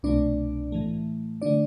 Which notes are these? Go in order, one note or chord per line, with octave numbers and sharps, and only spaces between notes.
C2 B2 A3 D4 D5
A2 E3 A3
D3 A3 D4 D5